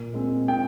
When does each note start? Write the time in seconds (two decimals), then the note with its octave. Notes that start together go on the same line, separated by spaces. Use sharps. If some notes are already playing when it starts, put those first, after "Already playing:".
Already playing: A#2
0.14 G#3 C4
0.48 A#2 G5